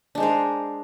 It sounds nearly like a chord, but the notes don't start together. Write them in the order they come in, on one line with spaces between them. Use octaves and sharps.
D4 G#3 C5 A#4